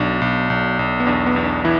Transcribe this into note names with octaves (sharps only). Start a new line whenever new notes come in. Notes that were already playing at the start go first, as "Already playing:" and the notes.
Already playing: B1 D4
B1
B1
B1
B3
E2 D4
B3
E2
D4
E3 E4